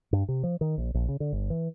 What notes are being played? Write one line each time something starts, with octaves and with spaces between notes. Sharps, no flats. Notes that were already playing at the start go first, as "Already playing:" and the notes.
G2
C3
F3
D#3
A#1
A#1
C#3
D3
G1
E3